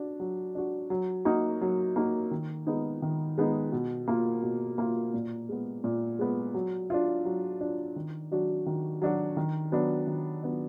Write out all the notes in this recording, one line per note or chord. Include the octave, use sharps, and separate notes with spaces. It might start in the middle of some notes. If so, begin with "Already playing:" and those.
Already playing: D4 F#4
F#3
D4 F#4
F#3
A#3 D#4 F#4
F#3
A#3 D#4 F#4
D#3
G#3 B3 D#4
D#3
G#3 B3 D#4
B2
A#3 F4
B2
A#3 F4
A#2
G#3 B3
A#2
G#3 B3
F#3
D4 F4
F#3
D4 F4
D#3
F#3 D4 F#4
D#3
F#3 D4 F#4
D#3
F#3 B3 D4
D#3
F#3 B3 D4